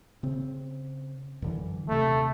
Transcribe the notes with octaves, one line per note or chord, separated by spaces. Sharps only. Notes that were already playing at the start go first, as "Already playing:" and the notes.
C#3 C4
F#2 D3 E3
D#1 C3 A3